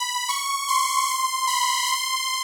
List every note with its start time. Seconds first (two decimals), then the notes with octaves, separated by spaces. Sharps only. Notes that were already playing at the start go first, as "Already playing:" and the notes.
Already playing: B5
0.29 C#6
0.68 C6
1.08 C6
1.47 B5
1.87 C6